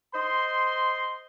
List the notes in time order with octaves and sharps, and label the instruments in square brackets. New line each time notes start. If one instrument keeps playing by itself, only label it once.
[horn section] C5 D#5 C6